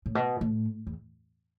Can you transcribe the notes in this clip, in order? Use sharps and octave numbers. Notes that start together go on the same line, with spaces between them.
A2
B2
A2
E2